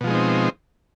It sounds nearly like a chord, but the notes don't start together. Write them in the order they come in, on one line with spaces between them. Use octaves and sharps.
B2 F3 G#3 D#4 C4